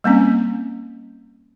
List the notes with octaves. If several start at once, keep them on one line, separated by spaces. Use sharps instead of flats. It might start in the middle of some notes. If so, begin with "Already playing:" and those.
G3 A#3 C4 C#4